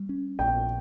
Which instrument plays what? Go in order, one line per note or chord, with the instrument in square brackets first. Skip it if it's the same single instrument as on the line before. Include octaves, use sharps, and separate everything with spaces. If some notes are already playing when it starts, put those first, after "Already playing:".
Already playing: [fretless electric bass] G3
C#4
[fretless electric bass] A#1 [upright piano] G5